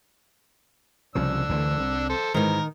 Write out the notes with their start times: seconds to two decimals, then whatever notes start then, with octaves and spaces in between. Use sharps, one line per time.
1.15 C2 C#3 F3 D4 E6
1.49 D2 D3 E3
1.80 C2
2.09 A4 C5
2.34 G#2 D#3 E3 A#4